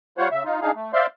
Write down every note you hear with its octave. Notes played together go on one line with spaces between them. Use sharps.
G3 F4 C5 C#5 F#5
C#3 E5
D#4 F4
D4 D#4 G#4 F5
A3
C5 D5 E5 F5 C6